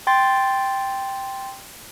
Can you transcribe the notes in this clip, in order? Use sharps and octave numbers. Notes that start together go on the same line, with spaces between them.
G5 C6 A6